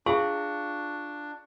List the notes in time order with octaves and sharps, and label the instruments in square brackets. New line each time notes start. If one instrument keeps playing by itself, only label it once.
[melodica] D4 [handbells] F4 F5 G5 [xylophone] G#4 [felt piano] C#6